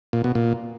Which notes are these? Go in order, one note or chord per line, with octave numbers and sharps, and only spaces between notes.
A#2
B2
A#2